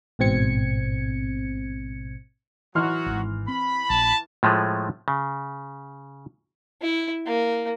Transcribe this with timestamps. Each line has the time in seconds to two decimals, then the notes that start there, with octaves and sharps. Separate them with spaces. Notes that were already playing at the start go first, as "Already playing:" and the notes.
0.19 A1 G#2 B2 C4 G#6 C#7
2.75 E3 F#3 F#4 C6 F6
3.06 G#1 G#2
3.48 C4 B5
3.90 A#1 A5
4.43 A2 F3 G#3 A3
5.08 C#3
6.82 E4
7.26 A#3